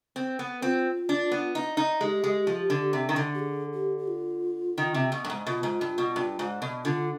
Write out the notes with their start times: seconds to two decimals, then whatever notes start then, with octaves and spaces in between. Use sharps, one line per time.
0.16 C4
0.39 B3
0.62 C4 F4
1.09 D4
1.32 B3
1.55 D#4
1.77 D#4
2.01 G#3 G4
2.24 G#3
2.47 F3
2.70 D3
2.93 C3
3.09 D#3
3.16 D3
3.35 G4
3.39 G#4
3.74 G4
3.98 G4
4.08 F4
4.78 D#3
4.94 C3
5.12 B2
5.24 G2
5.30 G#2
5.47 B2 F4
5.63 G#2
5.81 G2
5.98 B2
6.16 G2
6.39 G#2
6.62 B2
6.84 D3 F4